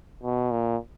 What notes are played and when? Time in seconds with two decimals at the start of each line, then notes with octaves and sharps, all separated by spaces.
0.23 B2
0.51 A#2